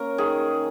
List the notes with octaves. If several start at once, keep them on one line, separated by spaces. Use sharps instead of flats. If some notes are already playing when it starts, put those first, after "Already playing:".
Already playing: A#3 C#4 A#4
D#3 G#4